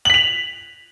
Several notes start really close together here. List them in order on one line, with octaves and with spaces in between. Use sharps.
F#7 B6 F7